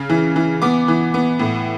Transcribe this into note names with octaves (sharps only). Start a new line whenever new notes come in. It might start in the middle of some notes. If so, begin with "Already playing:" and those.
Already playing: C#3
E3
E3
B3 D6
E3
B3
A2